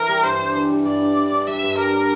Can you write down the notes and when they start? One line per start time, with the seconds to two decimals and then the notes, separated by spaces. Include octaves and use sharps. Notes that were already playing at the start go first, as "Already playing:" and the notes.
Already playing: E3 A#4
0.08 G3
0.23 G2 C5
0.39 D4
0.54 E3
0.70 G3
0.85 G2 D5
1.01 D4
1.17 D4
1.32 D4
1.47 G3 E5
1.63 G2
1.78 G3 A#4
1.93 D4